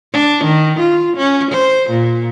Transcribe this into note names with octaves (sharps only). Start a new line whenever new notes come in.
D4
D#3
F4
C#4
C5
A#2